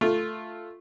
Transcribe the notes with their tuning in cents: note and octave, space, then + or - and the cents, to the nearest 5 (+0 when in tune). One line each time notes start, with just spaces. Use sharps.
A3 +0 F4 +0